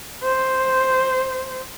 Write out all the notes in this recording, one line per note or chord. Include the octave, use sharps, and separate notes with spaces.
C5